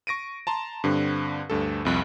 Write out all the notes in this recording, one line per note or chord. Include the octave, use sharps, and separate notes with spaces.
C#6 A#6 D7 D#7
A5 A#5 C6
G2 D3 C4
D2 G2 A4
C2 F2 F#6